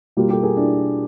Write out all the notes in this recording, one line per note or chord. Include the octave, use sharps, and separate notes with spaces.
B2 G3 A#3 F4 G4
G4 A4
G#4 A#4
D4 E4